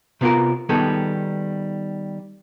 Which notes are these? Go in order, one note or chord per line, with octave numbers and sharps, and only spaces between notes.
C3 B3 F4 F#4 A#4
D#3 G3 B3 G#4 A4